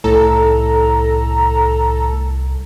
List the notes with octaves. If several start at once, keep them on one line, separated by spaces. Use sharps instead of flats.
C2 A2 A4 A#5